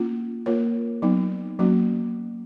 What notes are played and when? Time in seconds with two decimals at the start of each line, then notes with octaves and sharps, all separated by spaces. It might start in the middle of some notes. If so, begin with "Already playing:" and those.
Already playing: A#3 C#4 F4
0.46 A#3 F4 A#4 C#5
1.02 F#3 B3 D#4
1.59 F#3 A#3 C#4 F#4